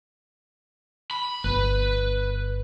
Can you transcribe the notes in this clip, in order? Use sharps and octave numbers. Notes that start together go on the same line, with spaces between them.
B5
G1 B4